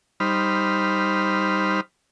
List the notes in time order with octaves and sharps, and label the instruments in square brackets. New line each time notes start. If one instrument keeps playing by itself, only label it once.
[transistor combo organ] G3 D#4 C5 B5 F6